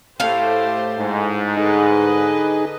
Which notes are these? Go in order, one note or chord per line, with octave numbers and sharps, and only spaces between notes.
A2 A3 G4 C5 F5
G#2
D3 D#4 G#4 B4 D#5